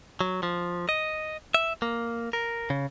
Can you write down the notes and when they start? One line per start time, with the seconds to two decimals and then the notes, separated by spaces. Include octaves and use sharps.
0.21 F#3
0.43 F3
0.89 D#5
1.54 E5
1.82 A#3
2.33 A#4
2.70 C#3